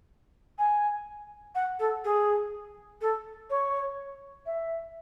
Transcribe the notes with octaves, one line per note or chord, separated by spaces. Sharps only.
G#5
F#5
A4
G#4
A4
C#5
E5